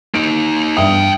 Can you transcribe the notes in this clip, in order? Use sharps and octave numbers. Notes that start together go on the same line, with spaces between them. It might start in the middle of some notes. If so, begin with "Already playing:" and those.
A#3 D#4 D7
G2 E5 F5 G5 D#6